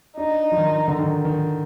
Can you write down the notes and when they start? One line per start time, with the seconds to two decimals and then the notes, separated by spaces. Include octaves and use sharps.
0.17 D4 D#4
0.52 F3
0.58 D#3
0.88 D3
0.99 D#3
1.25 D#3